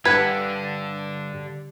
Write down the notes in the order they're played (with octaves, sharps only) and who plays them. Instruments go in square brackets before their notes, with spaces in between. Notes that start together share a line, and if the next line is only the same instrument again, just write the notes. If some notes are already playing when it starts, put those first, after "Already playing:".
[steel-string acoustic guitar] G2 [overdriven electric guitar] D3 F#5 [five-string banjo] B4 [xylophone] G#6